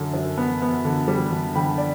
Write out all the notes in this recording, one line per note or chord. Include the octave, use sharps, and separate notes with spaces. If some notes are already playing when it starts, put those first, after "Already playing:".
Already playing: F#2 D3
F#2
B3
B3
D3
G3
D3
D3 G5 B5
D5